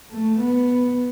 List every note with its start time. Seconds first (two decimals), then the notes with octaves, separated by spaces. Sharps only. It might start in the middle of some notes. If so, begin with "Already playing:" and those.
0.10 A3
0.38 B3